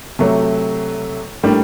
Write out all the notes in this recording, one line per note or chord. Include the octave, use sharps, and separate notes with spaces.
C3 F#3 A3
A2 G3 A#3 D4